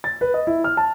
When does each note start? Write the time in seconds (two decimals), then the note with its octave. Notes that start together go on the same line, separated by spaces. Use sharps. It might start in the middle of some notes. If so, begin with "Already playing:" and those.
0.04 A6
0.21 B4
0.34 D#5
0.47 E4
0.64 F6
0.77 A5